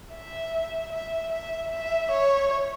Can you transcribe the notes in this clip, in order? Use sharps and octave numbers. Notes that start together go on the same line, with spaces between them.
E5
E5
E5
E5
C#5